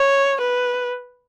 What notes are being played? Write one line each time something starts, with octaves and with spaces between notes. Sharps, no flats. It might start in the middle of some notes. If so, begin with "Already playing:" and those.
Already playing: C#5
B4